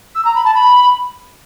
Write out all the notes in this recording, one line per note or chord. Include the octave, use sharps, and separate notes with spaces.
E6
A#5
B5
A5
B5